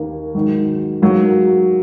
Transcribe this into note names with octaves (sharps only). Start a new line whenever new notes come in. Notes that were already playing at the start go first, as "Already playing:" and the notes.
Already playing: D#2 D#3 A#3
G#2 D#3 F#3
G#2 F#3 A#3